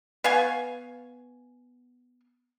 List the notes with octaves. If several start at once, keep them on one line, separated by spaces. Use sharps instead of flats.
B3 F5 G#5 C#6